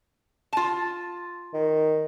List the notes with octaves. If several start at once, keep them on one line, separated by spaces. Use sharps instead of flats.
F4 A5
D#3